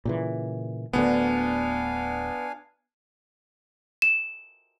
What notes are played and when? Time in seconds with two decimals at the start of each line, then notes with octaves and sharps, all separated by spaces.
0.05 A#2 C#3 E3
0.93 D1 D2 D3 B3 D4 F5 G#5
4.02 E7